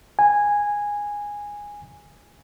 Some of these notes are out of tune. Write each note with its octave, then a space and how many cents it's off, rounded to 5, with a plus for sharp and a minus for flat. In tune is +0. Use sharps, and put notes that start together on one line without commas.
G#5 -10